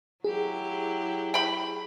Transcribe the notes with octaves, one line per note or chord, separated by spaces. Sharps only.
F#3 E4 G4 G#4
G5 B5